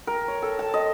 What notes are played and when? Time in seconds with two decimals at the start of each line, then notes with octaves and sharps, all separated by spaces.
0.07 A#4
0.28 C#5
0.42 A4
0.59 A5
0.74 D#5